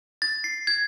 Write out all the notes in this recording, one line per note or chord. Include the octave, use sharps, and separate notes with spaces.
A6
C7
G#6